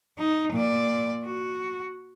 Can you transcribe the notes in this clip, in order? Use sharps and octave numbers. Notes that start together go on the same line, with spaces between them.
D#4
A#2 D5
F#4